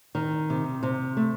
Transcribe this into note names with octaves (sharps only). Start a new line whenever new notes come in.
D#3
C3
C3
A3